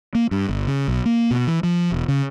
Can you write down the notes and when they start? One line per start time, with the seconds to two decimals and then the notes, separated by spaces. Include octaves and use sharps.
0.15 A#3
0.31 G2
0.49 G1
0.67 C#3
0.88 B1
1.05 A#3
1.31 B2
1.47 E3
1.63 F3
1.92 E1
2.08 C#3